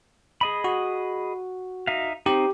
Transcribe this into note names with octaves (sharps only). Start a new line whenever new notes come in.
G#4 D#5 B5
F#4
D#4 E5 F5
C4 D#4 G4